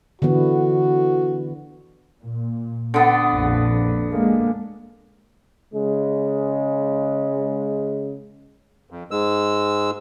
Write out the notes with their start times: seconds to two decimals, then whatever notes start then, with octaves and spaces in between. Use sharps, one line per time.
0.22 D3 E3 B3 F#4
2.22 A#2
2.94 D3 B3
3.31 A#1 F2
4.12 G#3 A#3
5.74 C#3 G#3
8.91 F2
9.11 G#2 G#3 E6